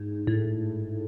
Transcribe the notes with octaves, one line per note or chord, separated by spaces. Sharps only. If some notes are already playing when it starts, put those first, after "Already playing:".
Already playing: G#2
A2